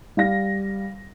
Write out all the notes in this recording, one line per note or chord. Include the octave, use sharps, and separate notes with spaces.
G3 F5 A#6